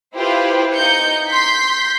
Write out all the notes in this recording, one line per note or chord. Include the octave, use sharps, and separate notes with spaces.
E4 F4 G4 B4 C5
D#4 G6 C#7
C6 G6 B6